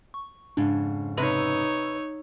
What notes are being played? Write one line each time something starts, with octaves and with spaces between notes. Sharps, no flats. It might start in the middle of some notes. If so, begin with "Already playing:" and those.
C#6
F2 G#2 C#3 D4
C3 D#4 B4 C#5 E6